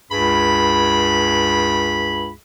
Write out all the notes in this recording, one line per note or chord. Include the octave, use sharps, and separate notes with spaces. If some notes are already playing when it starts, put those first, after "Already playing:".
C#2 G2 G#4 B5